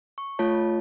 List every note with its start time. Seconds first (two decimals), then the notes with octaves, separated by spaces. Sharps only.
0.18 C#6
0.39 A3 F4 C#5 A5